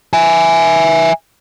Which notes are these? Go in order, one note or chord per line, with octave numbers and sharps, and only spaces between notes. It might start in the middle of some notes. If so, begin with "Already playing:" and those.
E5 G#5